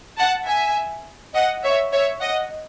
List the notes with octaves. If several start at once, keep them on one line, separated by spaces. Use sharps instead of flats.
F#5 A5
E5 G#5
D#5 F#5
C#5 E5
C#5 E5
D#5 F#5